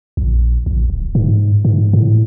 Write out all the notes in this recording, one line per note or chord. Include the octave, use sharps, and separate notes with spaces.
A#1
A#1
D1
G#2
G#2
A2